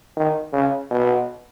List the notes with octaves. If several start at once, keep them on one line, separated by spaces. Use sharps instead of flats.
D#3
C#3
B2